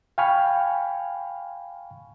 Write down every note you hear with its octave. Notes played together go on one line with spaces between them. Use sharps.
F5 G5 G#5 B5 C#6 F6